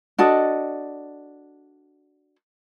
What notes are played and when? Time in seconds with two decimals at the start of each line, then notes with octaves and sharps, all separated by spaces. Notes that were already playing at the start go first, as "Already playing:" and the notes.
0.18 D4 F#4 A4 D#5